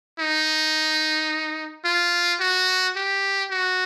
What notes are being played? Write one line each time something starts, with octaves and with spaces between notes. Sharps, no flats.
D#4
F4
F#4
G4
F#4